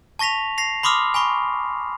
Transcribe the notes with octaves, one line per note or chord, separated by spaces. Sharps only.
A5 C#6 A#6 B6 F7
A#6 C7 F7
B5 C6 D6 D#6 F6
G#5 B5 C#6